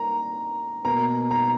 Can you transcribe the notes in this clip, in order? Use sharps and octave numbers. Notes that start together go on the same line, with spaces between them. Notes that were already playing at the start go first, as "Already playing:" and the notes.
Already playing: A#3 A#5
B2 A#3 A#5
A#5